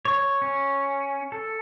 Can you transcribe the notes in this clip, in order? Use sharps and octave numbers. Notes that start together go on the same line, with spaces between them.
C#5
C#4
A4